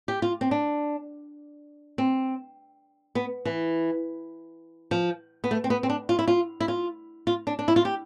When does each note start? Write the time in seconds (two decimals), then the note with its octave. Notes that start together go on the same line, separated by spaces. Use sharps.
0.08 G4
0.22 F4
0.41 C4
0.51 D4
1.98 C4
3.15 B3
3.45 E3
4.91 F3
5.44 B3
5.51 A3
5.64 C4
5.70 B3
5.83 C4
5.90 D4
6.09 F4
6.19 E4
6.28 F4
6.60 E4
6.68 F4
7.27 F4
7.47 D4
7.59 D4
7.68 E4
7.76 F4
7.85 G4